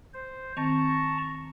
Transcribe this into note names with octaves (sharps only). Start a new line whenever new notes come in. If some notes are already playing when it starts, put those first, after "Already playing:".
C5
D#3 C4 A5 A#5 C#6